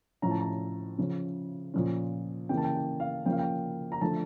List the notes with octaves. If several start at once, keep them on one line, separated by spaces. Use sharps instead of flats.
A2 F3 C#4 A#5
A5
A#5
C#3 F3 C#4
A#2 F3 C#4
C#3 E3 A#3 G5
A5
G5
G5
F5
C#3 F3 A#3 C#4 G5
F5
G5
A#5
D3 F3 A3 A5